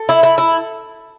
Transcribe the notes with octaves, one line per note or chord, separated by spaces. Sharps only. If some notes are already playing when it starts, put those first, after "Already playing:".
Already playing: A4
E4
E4
E4